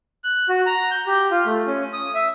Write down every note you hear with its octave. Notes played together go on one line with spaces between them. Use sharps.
F#6
F#4
A#5
G6
G4
F4
A3
C#4
D#6
E5